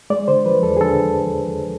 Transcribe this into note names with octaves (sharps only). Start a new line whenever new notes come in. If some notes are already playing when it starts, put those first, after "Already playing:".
G#3 D5
D3 C5
F3 B4
E2 A4
G#4
D3 A4